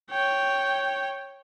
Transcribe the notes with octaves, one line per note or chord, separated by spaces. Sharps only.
C#5 G5